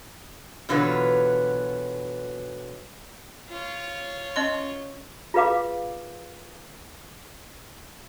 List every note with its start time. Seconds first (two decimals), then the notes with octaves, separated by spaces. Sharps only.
0.69 B2 D3 E3 F#3 F4 B4
3.49 F4 C#5
4.36 C#4 D#5 C6
5.34 F4 G#4 B4 F5 D6